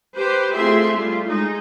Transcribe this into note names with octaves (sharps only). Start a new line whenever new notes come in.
G4 B4 C5
A3 C4 F4 G#4 E5 C6
G3 A3 F4
G#3 D#4